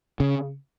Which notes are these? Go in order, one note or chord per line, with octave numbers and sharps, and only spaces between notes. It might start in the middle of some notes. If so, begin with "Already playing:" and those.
C#3